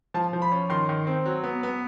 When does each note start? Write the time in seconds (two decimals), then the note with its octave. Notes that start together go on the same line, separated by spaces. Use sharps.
0.14 F3 A5
0.33 F3
0.42 B5
0.52 C#4
0.70 D#3 C6
0.89 D#3
1.07 C4
1.25 F#3
1.44 B3
1.63 B3